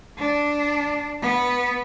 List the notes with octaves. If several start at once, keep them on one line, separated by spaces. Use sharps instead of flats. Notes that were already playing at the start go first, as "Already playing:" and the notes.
D4
B3